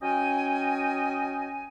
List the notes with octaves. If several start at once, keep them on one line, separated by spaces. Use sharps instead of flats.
F#3 C#4 D#5 G5 G#5